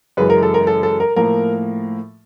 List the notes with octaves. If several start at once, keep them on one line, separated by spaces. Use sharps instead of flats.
F#2 C#3 E3 G#3 B4
A#4
A4
A#4
A4
A4
A#4
A2 F3 A#3 A#4